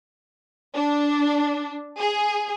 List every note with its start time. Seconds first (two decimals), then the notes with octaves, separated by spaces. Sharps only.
0.75 D4
1.99 G#4